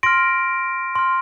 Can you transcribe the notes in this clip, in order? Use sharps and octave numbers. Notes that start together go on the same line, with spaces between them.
C6 F6 A#6 D7
C6 F6